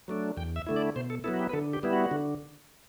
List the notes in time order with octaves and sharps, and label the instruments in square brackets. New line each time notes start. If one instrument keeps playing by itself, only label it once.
[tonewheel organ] F#3 A3 D4
E2 G5
E5
D3 A3 E4
D5
B2 C5
A4
F#3 B3 E4 A4
F#4
G4
B4
D3 A4
G4
G3 B3 E4
F#4
D3